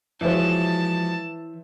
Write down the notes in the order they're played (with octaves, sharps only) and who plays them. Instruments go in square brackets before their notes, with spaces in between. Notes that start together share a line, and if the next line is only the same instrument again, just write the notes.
[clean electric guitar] E3 [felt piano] F3 G#3 F#4 [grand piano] C5 C#5 E5 [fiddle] A5